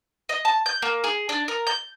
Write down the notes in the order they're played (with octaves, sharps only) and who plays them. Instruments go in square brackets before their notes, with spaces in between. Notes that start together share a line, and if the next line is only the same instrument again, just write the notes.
[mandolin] D#5
A5
G6
A#3
G#4
D4
A#4
G6